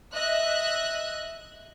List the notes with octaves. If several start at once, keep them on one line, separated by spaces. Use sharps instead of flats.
D#5 E5 F#6